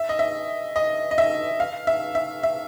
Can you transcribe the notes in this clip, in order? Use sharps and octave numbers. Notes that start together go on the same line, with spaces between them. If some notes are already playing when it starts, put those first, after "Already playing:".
Already playing: E5
D#5
E5
D#5
D#5
E5
F5
E5
E5
E5